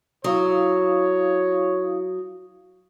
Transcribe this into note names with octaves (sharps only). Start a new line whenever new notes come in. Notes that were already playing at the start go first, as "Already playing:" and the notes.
F#3 E4 C#5 F5 D#6